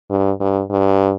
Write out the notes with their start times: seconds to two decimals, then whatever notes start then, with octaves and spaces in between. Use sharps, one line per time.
0.10 G2
0.40 G2
0.70 G2